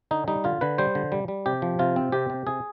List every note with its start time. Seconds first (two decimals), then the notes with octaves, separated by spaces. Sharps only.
0.11 D3 D#4
0.28 G3 D#4
0.44 D3 F4
0.61 D3 B4
0.78 G3 C5
0.95 D3
1.12 G3
1.28 G3
1.46 C3 G4
1.62 F3
1.79 C3 F4
1.96 C4
2.12 C3 G4
2.30 C3
2.46 C3 G#4